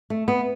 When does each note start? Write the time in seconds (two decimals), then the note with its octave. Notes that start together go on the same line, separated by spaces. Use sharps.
0.10 A3
0.28 B3